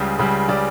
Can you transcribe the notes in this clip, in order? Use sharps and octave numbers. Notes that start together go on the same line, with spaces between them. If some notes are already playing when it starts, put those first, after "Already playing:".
Already playing: C#2 C#3 G3
C#2 C#3 G3
C#3 G3 D5